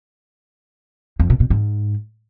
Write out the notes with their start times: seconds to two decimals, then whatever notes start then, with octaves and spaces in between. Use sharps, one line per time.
1.20 F2
1.30 B2
1.40 B2
1.50 G#2